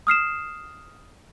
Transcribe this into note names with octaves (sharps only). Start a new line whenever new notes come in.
D#6 F6 C7 E7